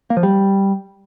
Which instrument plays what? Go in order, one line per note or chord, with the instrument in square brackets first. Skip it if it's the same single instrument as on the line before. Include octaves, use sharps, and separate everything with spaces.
[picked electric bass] A#3
F3
G3